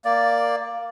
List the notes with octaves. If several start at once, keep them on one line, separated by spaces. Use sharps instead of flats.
A#3 D5